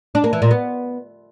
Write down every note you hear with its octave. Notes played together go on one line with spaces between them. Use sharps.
D4
A#3
E3
A#2
B3